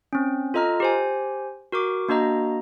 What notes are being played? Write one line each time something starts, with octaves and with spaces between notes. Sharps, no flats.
C4 C#4
F4 A4 D#5 A#5 F6
G4 C5 G#5
F#4 A#4 C#6 D6
A#3 D4 F#4 D#5 A#5